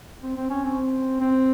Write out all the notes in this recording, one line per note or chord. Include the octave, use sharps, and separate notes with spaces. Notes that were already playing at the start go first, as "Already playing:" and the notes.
C4
C4
C#4
C4
C4